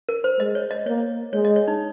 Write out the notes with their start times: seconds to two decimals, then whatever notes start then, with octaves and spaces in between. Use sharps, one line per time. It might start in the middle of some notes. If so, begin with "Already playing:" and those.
0.09 A#4
0.24 C5
0.39 G#3 D#5
0.55 C#5
0.71 D#5
0.86 A#3 C#5
1.33 G#3 C#5
1.45 D#5
1.56 C#5
1.68 D#4